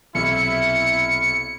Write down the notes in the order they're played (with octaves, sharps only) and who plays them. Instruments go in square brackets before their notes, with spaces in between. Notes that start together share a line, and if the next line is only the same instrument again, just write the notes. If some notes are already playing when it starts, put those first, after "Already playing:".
[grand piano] B1 C3 [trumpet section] E4 [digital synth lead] C#7